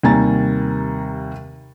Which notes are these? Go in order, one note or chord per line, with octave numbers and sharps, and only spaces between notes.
D#2 C3 G3 G#5 A#5 A6